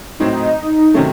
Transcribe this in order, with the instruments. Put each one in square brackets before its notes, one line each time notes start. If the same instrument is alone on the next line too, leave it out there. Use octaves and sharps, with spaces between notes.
[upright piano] A2 F#3 C4 [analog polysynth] D#4
[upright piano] C3 D#3 F#3 A3 [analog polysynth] C#4